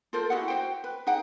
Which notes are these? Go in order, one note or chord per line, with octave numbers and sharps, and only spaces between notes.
F4 A4 A#4 C5
E4 F#4 G#4 F#5
F#4 C5 G5
B4
D#4 G#4 F#5 G5